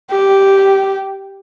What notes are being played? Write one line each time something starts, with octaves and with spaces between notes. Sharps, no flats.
G4